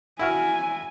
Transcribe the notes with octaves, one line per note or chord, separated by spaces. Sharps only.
E4 F#4 G#5 F6